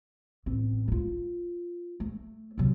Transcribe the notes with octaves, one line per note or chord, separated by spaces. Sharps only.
A1 C4
D#4 F4
A3
C3 F#3